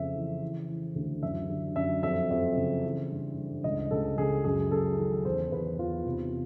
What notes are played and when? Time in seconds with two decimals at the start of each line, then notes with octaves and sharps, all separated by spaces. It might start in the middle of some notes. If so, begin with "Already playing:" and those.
Already playing: F2 C#3 E5
0.15 E3
0.42 E3
0.69 E3
0.95 D2
1.23 F#2 E5
1.50 D3
1.76 F#2 E5
2.03 F2 E5
2.30 F2
2.57 C#3
2.83 E3
3.10 G2
3.37 G2
3.64 C#2 D#5
3.91 C#2 A4
4.18 C#2 G#4
4.45 F#2 G#4
4.71 F#2 A4
4.98 D#3
5.25 E2 C5
5.52 E2 B4
5.78 E2 F4
6.06 C3